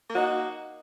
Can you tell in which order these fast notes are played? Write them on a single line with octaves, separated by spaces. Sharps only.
A#3 F#4 D#4